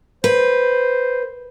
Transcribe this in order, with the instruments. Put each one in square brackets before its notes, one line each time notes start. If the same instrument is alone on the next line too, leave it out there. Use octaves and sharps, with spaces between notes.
[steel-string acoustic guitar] B4 [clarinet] C5